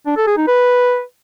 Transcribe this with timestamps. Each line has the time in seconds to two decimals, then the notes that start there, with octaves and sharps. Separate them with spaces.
0.07 D4
0.17 A4
0.27 G#4
0.37 D#4
0.47 B4